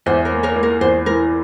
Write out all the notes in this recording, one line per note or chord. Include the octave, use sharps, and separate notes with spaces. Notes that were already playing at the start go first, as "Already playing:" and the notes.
E2 C5 E5
A#4 C#5
A#3
A#4 C#5
A#3
A#4
E2 C5
E3 A#4